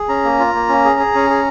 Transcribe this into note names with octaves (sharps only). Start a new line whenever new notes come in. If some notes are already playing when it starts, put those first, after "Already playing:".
Already playing: G#4
C#4 A#5
A#3
F4
A#3
C#4
G#4
G#4
C#4
G#4